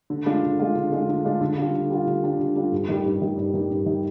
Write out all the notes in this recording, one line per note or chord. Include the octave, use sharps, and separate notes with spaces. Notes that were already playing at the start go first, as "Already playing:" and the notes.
D3
G#3 D4 F4
D3
G#3 D4 F4
D3
G#3 D4 F4
D3
G#3 D4 F4
D3
G3 D4 F4
D3
G3 D4 F4
D3
G3 D4 F4
D3
G3 D4 F4
G2
D#3 G3
G2
D#3 G3
G2
D#3 G3
G2
D#3 G3